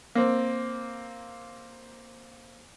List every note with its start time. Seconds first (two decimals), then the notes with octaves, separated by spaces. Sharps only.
0.15 A#3 C4